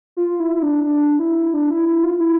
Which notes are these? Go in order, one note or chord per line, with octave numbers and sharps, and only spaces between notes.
F4
E4
E4
D4
D4
E4
D4
E4
E4
F4
E4